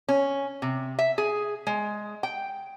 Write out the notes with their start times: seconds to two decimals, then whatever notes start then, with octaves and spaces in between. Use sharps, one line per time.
0.08 C#4
0.62 C3
0.99 E5
1.18 G#4
1.67 G#3
2.23 G5